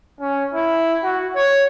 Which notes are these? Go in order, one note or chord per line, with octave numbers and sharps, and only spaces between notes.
C#4
E4
F#4
C#5